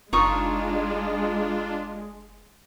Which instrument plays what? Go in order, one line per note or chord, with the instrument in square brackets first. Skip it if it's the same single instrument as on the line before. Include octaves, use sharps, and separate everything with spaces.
[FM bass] F#1 [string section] G#3 [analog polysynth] D4 F4 [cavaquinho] D#4 C#6 D#6